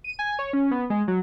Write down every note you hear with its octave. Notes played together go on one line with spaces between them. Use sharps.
D#7
G#5
C#5
C#4
B3
G#3
F#3